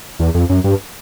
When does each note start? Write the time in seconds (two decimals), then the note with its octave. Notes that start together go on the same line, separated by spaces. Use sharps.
0.19 E2
0.34 F2
0.49 F#2
0.64 G2